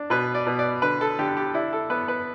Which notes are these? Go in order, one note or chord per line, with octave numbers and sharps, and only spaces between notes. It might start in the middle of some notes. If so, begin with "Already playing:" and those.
Already playing: D4
B2 B4
D5
B2
D5
D3 B4
A4
D3 G4
G4
D4 E4
A4
B3 B4
B4